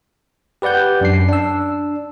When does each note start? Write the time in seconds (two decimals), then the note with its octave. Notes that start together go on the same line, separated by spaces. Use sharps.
0.62 G4 B4 D5 F#5 G6
1.01 F#2 D4 C7
1.29 D4 E6